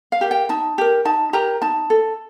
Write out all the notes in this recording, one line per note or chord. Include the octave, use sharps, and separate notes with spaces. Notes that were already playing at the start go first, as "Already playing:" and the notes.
F5
G4 A#4
G5
D#4 A5
G4 A#4
D#4 A5
G4 A#4 A#5
D#4 A5
A4